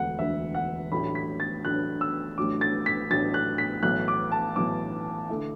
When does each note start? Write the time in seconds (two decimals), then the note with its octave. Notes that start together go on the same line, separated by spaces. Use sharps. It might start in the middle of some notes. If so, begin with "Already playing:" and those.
Already playing: E1 D2 D3 F#5
0.19 E1 D2 D3 E5
0.54 F#5
0.91 A1 A2 F#3 D4 B5
1.15 B6
1.40 A6
1.65 A1 A2 F#3 D4 F#6
2.01 E6
2.38 A1 A2 F#3 D4 D6
2.61 A6
2.86 B6
3.10 A1 A2 F#3 D4 A6
3.34 F#6
3.58 B6
3.83 B1 A2 E3 F#6
4.08 D6
4.32 A5
4.56 B1 A2 E3 D6
5.30 D3 A3 E4